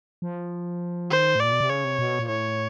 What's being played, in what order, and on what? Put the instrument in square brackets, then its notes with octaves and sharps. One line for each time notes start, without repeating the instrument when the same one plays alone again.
[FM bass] F3
[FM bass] D#3 [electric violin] C5
[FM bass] A2
[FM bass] A#2 [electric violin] D5
[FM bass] B2
C3
[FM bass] C#3 [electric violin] C#5
[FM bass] C3
B2
A#2
[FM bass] A2 [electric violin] C#5